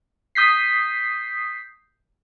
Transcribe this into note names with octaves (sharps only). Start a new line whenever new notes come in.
D#6 G6 B6 C7